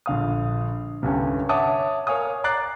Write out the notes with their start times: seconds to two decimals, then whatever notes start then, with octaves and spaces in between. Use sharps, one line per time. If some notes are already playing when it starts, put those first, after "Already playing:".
0.06 A#1 D3 F5 D#6
1.02 C2 G2 D3 C#4 G5
1.49 C#5 E5 F#5 A5 D6 D#6
2.07 A#4 C#5 F5 G#5 D#6
2.44 D5 A#5 D6 F#6 A6 C7